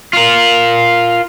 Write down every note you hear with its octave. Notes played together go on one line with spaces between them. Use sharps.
F4 A#4